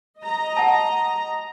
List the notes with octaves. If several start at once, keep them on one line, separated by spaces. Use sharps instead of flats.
D#5 A#5
F#5 A5